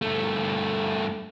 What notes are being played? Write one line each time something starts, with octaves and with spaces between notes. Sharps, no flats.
G2 A3